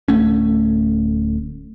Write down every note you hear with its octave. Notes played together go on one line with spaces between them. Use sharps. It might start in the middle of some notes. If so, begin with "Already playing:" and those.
D1 A3 C#4